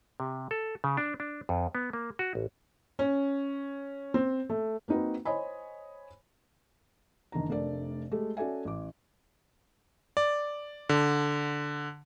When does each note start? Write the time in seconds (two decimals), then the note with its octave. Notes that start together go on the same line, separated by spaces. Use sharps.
0.20 C3
0.51 A4
0.84 C#3
0.97 D4
1.20 D4
1.49 F2
1.75 B3
1.93 A#3
2.19 F#4
2.35 A1
2.99 C#4
4.14 C4
4.50 A3
4.88 A#3 C4 D#4 F#4 B4
5.25 C5 C#5 D#5 G#5 B5
7.32 F#1 D#3 D4 A#5
7.49 F1 A3 D4 A#4 D5
8.11 G#3 A3 G4 A4
8.37 C#4 F#4 A4 D5 E5 G#5
8.65 A1 D6
10.17 D5
10.89 D3